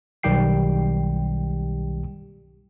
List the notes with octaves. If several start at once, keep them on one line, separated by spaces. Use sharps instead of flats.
B1 D#3 G3 G4 G5 C7